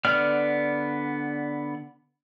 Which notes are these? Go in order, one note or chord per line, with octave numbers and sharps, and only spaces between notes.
D3 B3 D5 F6